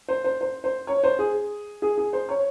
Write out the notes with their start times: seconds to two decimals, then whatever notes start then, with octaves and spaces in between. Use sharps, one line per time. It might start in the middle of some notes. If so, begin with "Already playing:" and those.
0.08 C5
0.24 C5
0.41 C5
0.64 C5
0.87 C#5
1.04 C5
1.19 G#4
1.82 G#4
1.98 G#4
2.13 C5
2.29 C#5